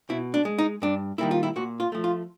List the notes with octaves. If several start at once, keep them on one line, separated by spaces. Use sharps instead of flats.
B2 E4
D4
G#3
D#4
G2 D4
D#3 G3 A#3 E4
F4
E4
A#2 F#4
F4
F3 A3
F4